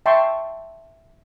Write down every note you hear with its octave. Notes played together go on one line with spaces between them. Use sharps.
E5 G5 A5 C6 C#6